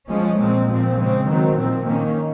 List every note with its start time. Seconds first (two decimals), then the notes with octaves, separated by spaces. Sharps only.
0.08 F3 G#3 C#4
0.38 A#2 G#3 C4
0.68 A#2 F3 C4
0.98 C#3 G#3 C4
1.27 D#3 F#3 C4
1.56 A#2 F3 C4
1.87 D#3 A#3 C#4